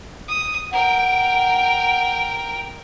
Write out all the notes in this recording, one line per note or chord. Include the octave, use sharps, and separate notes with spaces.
D#6
A#4 F#5 G5